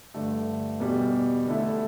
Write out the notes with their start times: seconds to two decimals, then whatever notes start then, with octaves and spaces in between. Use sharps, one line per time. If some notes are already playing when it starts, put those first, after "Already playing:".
0.14 G2 D3 A3
0.80 E2 B2 G3
1.46 E2 D3 A3 E4 A4